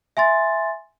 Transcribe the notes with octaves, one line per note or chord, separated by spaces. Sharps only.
E5 G#5 C6 A6